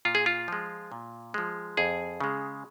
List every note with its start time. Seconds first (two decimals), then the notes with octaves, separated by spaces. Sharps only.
0.05 A#2 F4
0.15 G#4
0.26 F4
0.48 F3 G#3
0.92 A#2
1.34 F3 G#3
1.77 F2 G#4
2.21 C#3 G#3